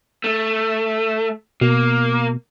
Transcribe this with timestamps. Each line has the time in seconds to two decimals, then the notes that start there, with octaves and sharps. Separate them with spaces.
0.24 A3
1.61 B2 A#3